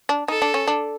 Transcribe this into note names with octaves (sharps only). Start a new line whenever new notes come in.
D4
D#4 A4
D4
C#4
D4